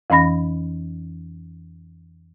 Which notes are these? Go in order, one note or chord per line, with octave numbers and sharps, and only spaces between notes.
F2 E3 C#4 B5 A#6